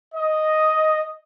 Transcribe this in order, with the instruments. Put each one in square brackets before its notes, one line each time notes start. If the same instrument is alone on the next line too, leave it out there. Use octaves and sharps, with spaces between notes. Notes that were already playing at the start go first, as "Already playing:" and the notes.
[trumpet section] D#5